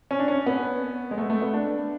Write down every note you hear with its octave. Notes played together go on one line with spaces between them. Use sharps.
C#4
D4
C#4
B3
G#3
A3
A3
B3
D4